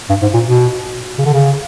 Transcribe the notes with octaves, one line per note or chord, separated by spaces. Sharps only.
G2
G#2
A#2
B2
C#3
D3
C#3